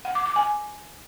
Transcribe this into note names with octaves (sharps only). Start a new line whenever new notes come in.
F#5
D6
D6
G#5